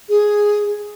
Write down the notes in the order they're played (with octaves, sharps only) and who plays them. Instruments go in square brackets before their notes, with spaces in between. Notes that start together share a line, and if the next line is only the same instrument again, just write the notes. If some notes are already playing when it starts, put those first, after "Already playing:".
[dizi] G#4